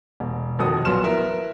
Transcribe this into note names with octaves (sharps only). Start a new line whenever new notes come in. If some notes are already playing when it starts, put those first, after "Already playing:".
E1
F1 D#3 F3 F#4 A4 D#6
A#1 F#3 B3 C6 F6 E7
B3 E4 A#4